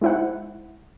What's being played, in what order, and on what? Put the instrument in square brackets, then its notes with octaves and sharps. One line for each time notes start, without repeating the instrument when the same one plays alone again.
[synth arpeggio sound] G#3 D#4 E4 C5 F#5